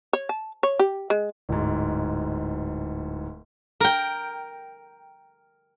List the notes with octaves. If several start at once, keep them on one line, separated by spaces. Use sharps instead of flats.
C#5
A5
C#5
G4
G#3
D1 G#2
A#4 G5